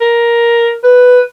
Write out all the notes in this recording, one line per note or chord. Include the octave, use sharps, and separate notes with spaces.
A#4
B4